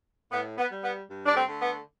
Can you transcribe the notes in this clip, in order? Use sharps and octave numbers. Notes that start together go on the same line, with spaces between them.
A2 B3
B3
G3
B3
G2
D4
A3 C4
D3 A3
B3